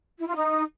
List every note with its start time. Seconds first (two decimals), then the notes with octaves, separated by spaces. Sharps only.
0.19 E4
0.27 F4
0.35 D#4